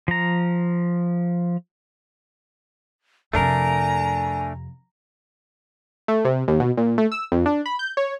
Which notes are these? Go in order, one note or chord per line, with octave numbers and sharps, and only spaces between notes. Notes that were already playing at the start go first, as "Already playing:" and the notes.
F3 A#5
F2 C3 A3 D4 A#4 G#5 A#5
A3
C3
D#2
B2
A#2
A3
E6
F2
D4
B5
G6
C#5